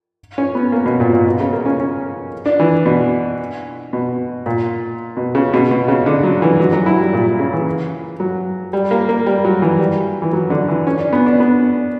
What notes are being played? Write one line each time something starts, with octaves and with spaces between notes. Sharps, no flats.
C#4
B3
A#3
B2
A#2
A#2
B2
C#3
A#3
C#4
C#4
D4
E3
B2
B2
A#2
B2
C#3
B2
B2
C#3
D3
F#3
E3
F#3
F#3
E4
G3
A#2
C#3
E3
F#3
G3
A#3
A#3
G3
F#3
E3
G3
E3
F#3
D3
E3
C#4
D4
B3
D4
B3